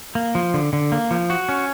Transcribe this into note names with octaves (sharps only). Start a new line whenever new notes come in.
A#3
F3
D3
D3
A#3
F3
F#4
C#4